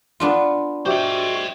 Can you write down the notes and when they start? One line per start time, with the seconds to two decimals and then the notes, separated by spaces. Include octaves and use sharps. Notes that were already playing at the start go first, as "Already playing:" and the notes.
0.20 B3 D4 F4
0.86 F#4 G4 C5 D#5 E5